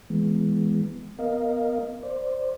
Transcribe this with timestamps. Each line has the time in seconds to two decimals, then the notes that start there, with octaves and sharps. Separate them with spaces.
0.10 E3 G#3 B3
1.19 B3 A#4 D#5 F5
2.03 C5 D5